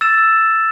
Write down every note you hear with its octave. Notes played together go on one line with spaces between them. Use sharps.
E6 A6 E7